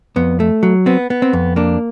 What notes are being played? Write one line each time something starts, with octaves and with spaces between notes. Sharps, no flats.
F2 B3
A3
F#3
B3 C4
B3
C4
F2
A#3 D4